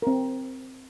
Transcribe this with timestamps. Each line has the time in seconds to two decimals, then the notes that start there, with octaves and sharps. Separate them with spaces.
0.02 C4 A#4